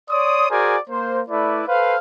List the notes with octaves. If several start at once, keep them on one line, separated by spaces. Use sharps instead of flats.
C#5 D5 C6 D#6
F#4 G#4 A#4 C5 D5 G#5
A#3 C5
A3 E4 B4 D5
A4 B4 C5 F5